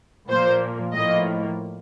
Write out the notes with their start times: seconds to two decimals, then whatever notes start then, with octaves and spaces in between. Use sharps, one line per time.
0.28 A#2 F3 A#3 C5
0.93 A2 F3 A#3 D#5